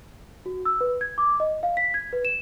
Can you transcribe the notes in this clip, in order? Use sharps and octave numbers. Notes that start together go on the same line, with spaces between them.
F#4
E6
B4
G#6
D6
D#5
F5
B6
G#6
B4
E7